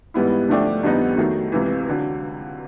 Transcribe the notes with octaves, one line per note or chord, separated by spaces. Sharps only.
G#2 E3 G3 B3 E4
D3 F3 A3 D4 G4
F2 D3 G3 B3 D#4
D#3 F#3 A3
C#2 C3 E3
D3 F#3